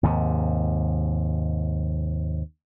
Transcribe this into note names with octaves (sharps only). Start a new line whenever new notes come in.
D#2 G#2 C3